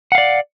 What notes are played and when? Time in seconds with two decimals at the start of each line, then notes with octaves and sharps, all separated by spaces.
0.12 F#5
0.15 F5
0.18 D5